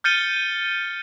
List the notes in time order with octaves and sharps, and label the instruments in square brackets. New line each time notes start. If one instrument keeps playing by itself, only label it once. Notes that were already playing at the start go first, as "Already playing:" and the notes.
[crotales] F6 G6 A6 C#7 D#7 G7